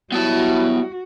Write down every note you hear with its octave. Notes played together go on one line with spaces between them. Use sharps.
F#3 G3 B3 E4 F#4 A5